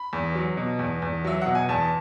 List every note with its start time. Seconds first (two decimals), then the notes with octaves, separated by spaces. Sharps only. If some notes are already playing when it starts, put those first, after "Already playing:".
Already playing: B5
0.13 E2
0.35 F#3
0.57 B2
0.79 E2
1.02 E2
1.24 F#3 E5
1.42 B2 F#5
1.55 G#5
1.69 E2 A5